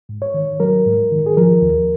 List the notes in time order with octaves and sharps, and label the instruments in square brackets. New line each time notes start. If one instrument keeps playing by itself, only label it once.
[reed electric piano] G#2
C#5
D#3
F#3 A#4
G#2
D#3
G#4
F3 A#4
D#2